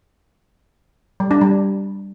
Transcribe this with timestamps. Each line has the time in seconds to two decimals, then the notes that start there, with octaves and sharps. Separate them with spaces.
1.20 G3
1.31 D4
1.41 G3